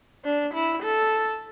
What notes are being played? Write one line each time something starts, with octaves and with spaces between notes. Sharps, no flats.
D4
E4
A4